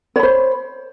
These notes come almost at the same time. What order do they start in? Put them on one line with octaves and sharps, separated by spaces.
C#5 B5 C5